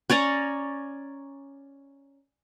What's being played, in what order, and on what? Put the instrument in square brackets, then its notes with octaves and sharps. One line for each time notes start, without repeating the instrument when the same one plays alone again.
[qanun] C#4 C#5 D5 A#5